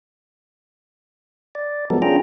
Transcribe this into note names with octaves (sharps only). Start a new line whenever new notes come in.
D5
F3 F#3 G#3 B3 A4 A#4
C#4 D4 F4 G#4 G5 A#5